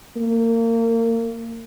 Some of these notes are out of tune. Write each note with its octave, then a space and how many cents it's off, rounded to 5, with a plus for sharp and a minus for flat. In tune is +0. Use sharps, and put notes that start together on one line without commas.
A#3 -30